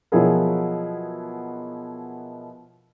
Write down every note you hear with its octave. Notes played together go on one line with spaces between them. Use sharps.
B2 F3 F#3 E4 G#4 A#4